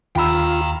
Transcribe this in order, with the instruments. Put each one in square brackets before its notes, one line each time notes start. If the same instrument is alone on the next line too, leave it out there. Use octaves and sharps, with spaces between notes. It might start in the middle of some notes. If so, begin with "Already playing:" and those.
[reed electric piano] D#2 B5 E6 [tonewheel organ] F4 [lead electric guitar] G5 A#5